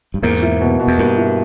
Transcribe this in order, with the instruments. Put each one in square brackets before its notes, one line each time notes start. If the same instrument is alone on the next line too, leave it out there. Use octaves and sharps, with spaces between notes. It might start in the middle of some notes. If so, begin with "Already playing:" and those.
[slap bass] G2
[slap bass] E2 G#2 [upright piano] A#3
[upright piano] E4
B2
B2
[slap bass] E2
[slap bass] G2 [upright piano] A#3
[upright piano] E4